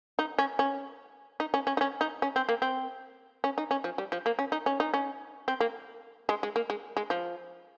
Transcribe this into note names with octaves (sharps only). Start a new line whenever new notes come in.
D#4
C#4
C#4
D#4
C#4
C#4
D#4
C#4
D#4
C#4
C4
A#3
C4
C#4
D#4
C#4
F3
G3
F3
A#3
C#4
D#4
C#4
D#4
C#4
C4
A#3
G#3
G#3
A#3
G#3
G#3
F3